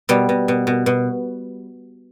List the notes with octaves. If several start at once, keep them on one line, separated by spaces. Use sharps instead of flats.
B2 G3
B2
B2
B2
B2